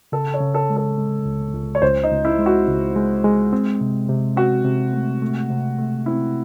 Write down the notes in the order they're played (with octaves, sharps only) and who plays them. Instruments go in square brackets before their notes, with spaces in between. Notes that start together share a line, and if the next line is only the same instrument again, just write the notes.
[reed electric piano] C#3 [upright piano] A4
[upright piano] C#5
[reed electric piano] C#3
[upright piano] A4
[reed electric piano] G#3
[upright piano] A4
[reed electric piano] G#3
C#2
C#2
[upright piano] C#5
[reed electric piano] C#2 [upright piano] C5
[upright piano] D#4
[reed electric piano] C#2
[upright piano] E4
[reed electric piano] G#3
[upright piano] F#4
[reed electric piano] C#2
G#3
G#3
C4
C3
C3
[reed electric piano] C4 [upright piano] F#4
[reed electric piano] C3
A3
A3
C3
A3
[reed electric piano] C4 [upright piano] E4